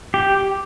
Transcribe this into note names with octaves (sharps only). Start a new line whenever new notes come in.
G4